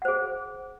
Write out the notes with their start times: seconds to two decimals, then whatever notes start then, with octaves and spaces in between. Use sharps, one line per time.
0.02 F#5
0.05 C5
0.08 G#4